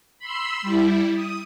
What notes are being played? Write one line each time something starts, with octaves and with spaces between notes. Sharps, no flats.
B5 C6 E6
G3 E4
D#6